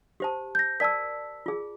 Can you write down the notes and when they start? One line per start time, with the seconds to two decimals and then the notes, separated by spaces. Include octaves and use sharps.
0.20 G4 C5 A5
0.55 G6 A#6
0.80 A#4 D5 A5 E6 B6
1.46 F4 G#4